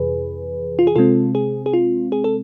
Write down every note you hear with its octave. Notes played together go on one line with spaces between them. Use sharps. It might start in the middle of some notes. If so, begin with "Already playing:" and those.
Already playing: F2 C3 E3 G#4 B4
F4
G#4
C3 G#3 C4 F4 A4
G#4
G#4
F4
G#4
A4